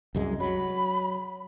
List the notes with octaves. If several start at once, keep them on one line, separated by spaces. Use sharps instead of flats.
C2 F#2 G#3
F#3 B5